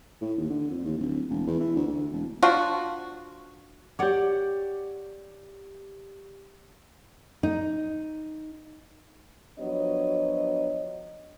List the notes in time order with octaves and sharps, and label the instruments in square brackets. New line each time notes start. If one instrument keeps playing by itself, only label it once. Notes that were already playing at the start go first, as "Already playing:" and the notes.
[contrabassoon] A2
D#2
D3
F2
D#2
D1
E1
E2
E3
D2
D2
E1
[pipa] F3 D4 F4 F#4
[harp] G4 D5 D6 [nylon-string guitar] C#5 F#5
[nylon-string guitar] D#4
[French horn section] F3 F#3 B3 D4 C#5 D#5